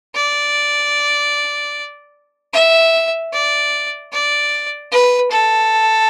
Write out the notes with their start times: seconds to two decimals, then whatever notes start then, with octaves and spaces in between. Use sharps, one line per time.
0.15 D5
2.53 E5
3.33 D5
4.12 D5
4.92 B4
5.31 A4